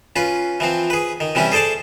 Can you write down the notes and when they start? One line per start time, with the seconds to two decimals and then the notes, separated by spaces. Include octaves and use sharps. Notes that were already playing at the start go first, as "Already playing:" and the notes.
0.16 C#4 F4 B4
0.60 E3 F3 C4
0.90 G#4 B4
1.20 D#3
1.35 C3 E3 G3 C#4 E4
1.52 G#4 A4 C5 D5 A5